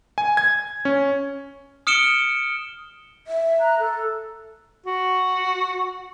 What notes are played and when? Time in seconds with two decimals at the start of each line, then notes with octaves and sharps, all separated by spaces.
0.18 G#5
0.37 G#6
0.85 C#4
1.87 D#6 F6 C#7 D7 E7 G7
3.27 E5
3.60 A#5 F#6
3.79 A4
4.86 F#4